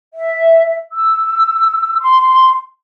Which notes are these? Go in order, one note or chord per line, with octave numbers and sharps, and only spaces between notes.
E5
E6
C6